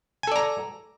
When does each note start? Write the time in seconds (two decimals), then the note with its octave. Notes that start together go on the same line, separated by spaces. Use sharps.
0.23 G#5
0.27 A4
0.32 D5
0.36 A#5